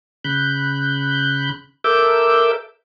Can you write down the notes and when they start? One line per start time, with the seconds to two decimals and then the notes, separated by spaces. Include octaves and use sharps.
0.24 C#3 B5 F#6 G6
1.84 A4 A#4 E5 D6 E6 G6